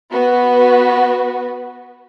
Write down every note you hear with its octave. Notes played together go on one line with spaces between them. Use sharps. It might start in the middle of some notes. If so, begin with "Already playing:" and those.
B3 F#4 B4